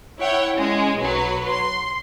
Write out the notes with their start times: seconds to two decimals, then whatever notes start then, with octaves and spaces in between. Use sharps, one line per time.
0.18 E4 C#5 F#5 G5
0.54 G#3 C#4
0.98 B1 F#3 B4
1.48 C6